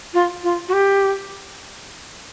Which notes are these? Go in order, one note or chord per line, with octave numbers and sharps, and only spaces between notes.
F4
F4
F#4
G4